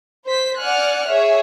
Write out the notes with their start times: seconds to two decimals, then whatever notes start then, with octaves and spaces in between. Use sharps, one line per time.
0.25 C5 B6
0.59 D5 F#5 G#5 F6 F#6
1.07 G#4 C#5 E5